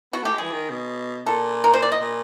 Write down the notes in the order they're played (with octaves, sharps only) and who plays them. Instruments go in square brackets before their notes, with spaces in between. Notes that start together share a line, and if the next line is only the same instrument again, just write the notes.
[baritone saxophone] B3 [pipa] F#4
[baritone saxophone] A3 [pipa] G4
[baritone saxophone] G#3
[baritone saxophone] E3 [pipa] G#4
[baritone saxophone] D#3
B2
[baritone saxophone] A#2 [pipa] A4
[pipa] A#4
C5
D5
D#5
[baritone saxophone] A#2